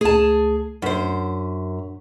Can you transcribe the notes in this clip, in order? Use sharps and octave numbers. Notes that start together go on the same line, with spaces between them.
C#2 A3 G#4 A5
F#2 D4 C5 B6